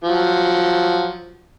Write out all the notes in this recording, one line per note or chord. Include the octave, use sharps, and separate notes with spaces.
F3 F#3